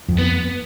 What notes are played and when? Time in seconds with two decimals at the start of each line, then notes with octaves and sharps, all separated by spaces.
0.08 F2
0.19 B3